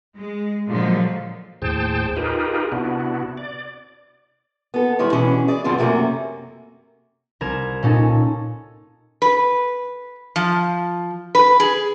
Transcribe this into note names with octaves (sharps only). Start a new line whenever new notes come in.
G#3
A#2 D3 F3 F#3 G#3
D#2 A2 G#4 C5 G5 A5
D#4 F4 G4 G#4 A#4 B4
C3 B3 D4 E4 F#4
D5
B3 A4
D#3 G3 G#3 E4 C#5
B2 E3 C#4 D4
G#4 D5
G2 D3 F3 C4 F4
F#2 C3 A3 A#3 C#4
C2 A#4 A#5 G#6 E7
A#2 C#4 D#4 A4
B4
F3
B4
G#4